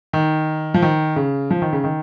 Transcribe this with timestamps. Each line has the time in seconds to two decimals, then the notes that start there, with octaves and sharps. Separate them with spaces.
0.13 D#3
0.74 F3
0.82 D#3
1.16 C#3
1.51 F3
1.62 D#3
1.73 C#3
1.84 D#3